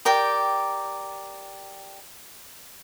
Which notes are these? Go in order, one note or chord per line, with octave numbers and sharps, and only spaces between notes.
G4 A#4 D5 G5